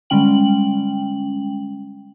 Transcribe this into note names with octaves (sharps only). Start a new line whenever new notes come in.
D3 G3 G#3 C#4 G5 F#7